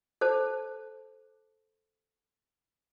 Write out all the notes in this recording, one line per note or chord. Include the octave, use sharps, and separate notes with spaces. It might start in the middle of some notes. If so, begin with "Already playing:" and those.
A4 C5 A5